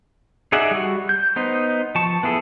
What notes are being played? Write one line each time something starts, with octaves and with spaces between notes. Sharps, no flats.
D#4 G#4 D5 E5 F#5
G3 F#4
G6
B3 D#4 C5
F3 A5 C#6
B3 E4 G#4 A4